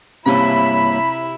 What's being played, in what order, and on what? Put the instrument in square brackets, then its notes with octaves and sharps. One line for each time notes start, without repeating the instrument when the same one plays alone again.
[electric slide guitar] G2 A#3 C#5 [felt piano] C3 [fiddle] E4 E5 [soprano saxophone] B5